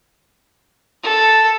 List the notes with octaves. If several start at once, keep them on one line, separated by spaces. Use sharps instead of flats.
A4